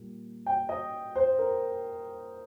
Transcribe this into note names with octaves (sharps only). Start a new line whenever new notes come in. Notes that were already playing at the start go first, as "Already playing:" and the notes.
Already playing: A#2 G3 A#3
G5
D#5
C5
A#4